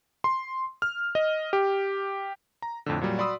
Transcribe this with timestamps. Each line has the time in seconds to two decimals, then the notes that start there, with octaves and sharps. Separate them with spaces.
0.24 C6
0.82 F6
1.15 D#5
1.53 G4
2.62 A#5
2.86 F2 A2 D3
3.01 A#2 F#3 G3
3.18 F#4 D5 B5 C6 D#6 E6